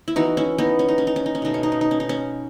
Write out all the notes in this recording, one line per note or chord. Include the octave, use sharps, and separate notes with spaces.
E4
E3 B3 D#4 F#4
C#4 E4
B3 D#4
C#4
D#4
C#4
D#4
C#4
D#4
C#4
B2 A3 D#4
C#4
D#4
C#4
D#4
C#4
D#4
C#4